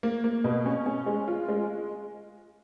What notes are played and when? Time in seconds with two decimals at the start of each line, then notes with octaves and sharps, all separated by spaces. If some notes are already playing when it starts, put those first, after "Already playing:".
0.03 A#3
0.24 A#3
0.44 B2
0.66 C#4
0.86 C#4
1.06 G#3
1.28 F4
1.48 G#3